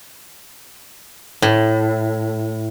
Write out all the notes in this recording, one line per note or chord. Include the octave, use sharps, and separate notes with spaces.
A2